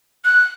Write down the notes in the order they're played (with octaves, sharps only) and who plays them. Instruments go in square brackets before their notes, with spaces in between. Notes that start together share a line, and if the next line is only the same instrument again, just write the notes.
[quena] F#6